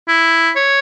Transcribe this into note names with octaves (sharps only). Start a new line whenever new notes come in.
E4
C#5